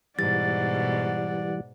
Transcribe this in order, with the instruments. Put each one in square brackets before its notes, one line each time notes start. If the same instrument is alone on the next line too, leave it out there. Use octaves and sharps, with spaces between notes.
[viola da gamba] G#2 B2 [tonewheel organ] E3 G3 [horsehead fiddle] D5 F#5 [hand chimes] A6